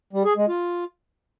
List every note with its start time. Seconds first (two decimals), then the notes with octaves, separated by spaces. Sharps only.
0.13 G3
0.25 G#4
0.36 G#3
0.48 F4